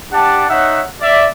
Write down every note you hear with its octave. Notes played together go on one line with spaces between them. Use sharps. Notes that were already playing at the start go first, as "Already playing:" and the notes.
D4 G4 D5 F#5 A5
D#4 C#5 E5 F#5
D5 E5